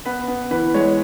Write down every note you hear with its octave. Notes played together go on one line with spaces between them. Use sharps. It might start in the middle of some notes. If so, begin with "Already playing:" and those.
B3 B4
B3
E3 B4
G#3 C#5